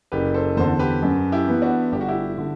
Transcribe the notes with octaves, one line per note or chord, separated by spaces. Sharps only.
F#1 G4 B4
A4 C5
E2 D3 A4 C5
G4 B4
F#2
E4 G4
E3 B3
D4 F#4
G1 G4
F#4
E4 G4
D3